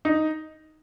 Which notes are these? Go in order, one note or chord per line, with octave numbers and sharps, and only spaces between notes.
D#4